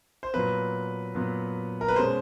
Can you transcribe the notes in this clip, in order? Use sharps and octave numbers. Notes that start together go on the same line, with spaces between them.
C5
A#2 F#3 B3 B4
A#2 F#3 B3
A#4
B4
B2 G#3 C#4 C5